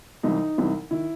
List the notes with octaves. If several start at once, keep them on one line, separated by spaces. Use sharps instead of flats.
C2 C3 E3 D#4
C2 C3 E3
D#3 E4